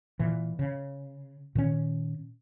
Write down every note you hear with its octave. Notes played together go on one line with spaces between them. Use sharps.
A#2 E3
C#3
A#2 D#3 C#4